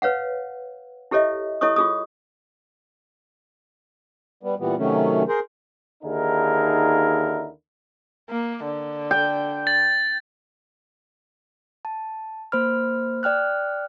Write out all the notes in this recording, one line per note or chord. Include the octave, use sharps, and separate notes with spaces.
B4 C#5 F5 F#5
E4 G4 A4 C#5 D#5 E5
E4 A4 C#5 D#5 C#6 D#6
F4 G#4 D#6
G3 B3
A#2 E3 G3 B3
C3 D#3 F#3 A3 C#4
G#4 A#4 C5
D#2 D3 D#4 E4 G#4 A#4
A#3
D3
G5
A6
A5
A#3 C5 B5 F6
D5 G5 F6 F#6